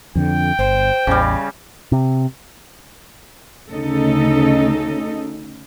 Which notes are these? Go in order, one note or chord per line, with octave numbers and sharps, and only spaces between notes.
F2 D3 G5
G1 C5
A1 E2 C#3 G3
C3
D2 C#3 C#4 D#4 A4 D#5